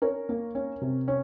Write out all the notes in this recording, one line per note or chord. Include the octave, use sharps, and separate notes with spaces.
C#4 A#4 C#5
A#3
C#4
C3
C#4